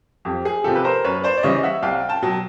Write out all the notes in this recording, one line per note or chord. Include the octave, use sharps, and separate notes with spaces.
F2 G4
G#4
C3 F3 G4 A4
B4
A#4 C5
F#2 B4 C#5
C5 D5
D5
C#3 E3 G3 C#5 D#5
E5 F#5
C2 F5 G5
G5 A5
B2 F#3